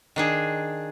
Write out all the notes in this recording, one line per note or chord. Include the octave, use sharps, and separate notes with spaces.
D#3 D4 G#4